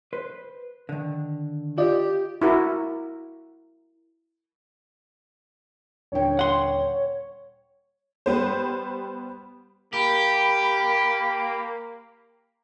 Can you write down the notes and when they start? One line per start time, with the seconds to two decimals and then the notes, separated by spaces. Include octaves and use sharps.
0.13 B4 C5
0.89 D3 D#3
1.78 F4 G4 D5 D#5
2.42 E4 F#4 A#4
6.12 D#1 D3 C#5 G5
6.39 F#5 C6
8.26 G3 B3 C5
9.94 A#3 G4 B5